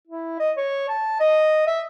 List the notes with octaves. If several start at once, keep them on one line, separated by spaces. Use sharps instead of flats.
E4
D#5
C#5
A5
D#5
E5